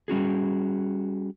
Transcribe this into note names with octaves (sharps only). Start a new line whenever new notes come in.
G3 C#4 F#4 G#4